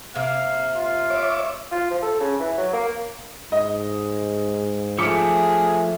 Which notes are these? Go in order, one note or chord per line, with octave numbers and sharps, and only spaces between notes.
C3 A#3 F5
F4
C#5 E5 D6
F4
F3
A4
C#3
E3
F#3
A#3
G#2 D#5
F3 A3 G#4 D6 B6 C#7